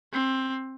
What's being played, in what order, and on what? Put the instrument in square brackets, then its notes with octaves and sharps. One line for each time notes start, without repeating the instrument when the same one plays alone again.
[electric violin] C4